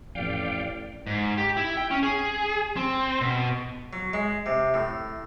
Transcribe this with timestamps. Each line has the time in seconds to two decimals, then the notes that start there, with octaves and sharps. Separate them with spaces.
0.15 A1 F2 A2 D5 F5 G5
1.07 G#2
1.37 G4
1.57 E4
1.77 G5
1.91 C#4
2.03 G#4
2.77 C4
3.21 B2
3.93 F#3
4.13 G#3
4.46 C3
4.74 A2